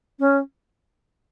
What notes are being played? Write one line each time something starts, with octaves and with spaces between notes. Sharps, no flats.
C#4